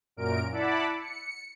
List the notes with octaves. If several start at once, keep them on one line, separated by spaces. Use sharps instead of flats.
F#2 A#2 A#4 D7
E4 D5 F#5 A5 B5 D6
C#7